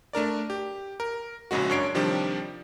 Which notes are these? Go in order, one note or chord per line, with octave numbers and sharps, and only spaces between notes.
A3 D4 A#4 D5
G4
A#4
A#1 G#2 C#3 G#3 F#4
F#2 D4 C#5 C7 D7
C3 D#3 F3 G3 D4 G4